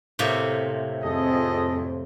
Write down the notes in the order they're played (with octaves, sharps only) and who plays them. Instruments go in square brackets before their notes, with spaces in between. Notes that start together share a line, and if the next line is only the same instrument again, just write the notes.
[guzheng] A2 C3 A#3
[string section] F2 [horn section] G#4 A4 D#5